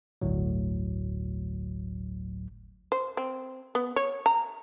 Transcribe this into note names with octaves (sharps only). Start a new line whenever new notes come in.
G1 D2 A2 F#3
C5
C4
B3
C#5
A#5